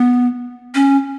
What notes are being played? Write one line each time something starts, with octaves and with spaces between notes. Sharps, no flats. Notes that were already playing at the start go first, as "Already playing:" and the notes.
Already playing: B3
C#4